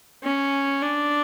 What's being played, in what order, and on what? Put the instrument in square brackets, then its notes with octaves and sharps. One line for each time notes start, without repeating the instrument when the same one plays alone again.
[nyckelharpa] C#4
D4